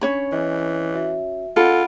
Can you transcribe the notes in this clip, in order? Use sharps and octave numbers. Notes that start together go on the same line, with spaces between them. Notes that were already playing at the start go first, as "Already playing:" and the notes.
C#4 D4 C#5 B5
E3 D#5
F#4 E5
F4 A4 F#5 B5 D7